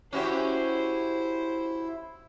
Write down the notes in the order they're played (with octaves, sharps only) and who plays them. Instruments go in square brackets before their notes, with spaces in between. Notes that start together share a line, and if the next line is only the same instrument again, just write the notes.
[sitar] C#4 F#4 G4 [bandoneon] E4 [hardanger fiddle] C5